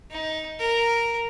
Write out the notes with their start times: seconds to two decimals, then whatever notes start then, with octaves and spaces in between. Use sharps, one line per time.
0.11 D#4
0.59 A#4